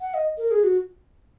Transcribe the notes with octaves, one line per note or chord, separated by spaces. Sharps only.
F#5
D#5
A#4
G#4
F#4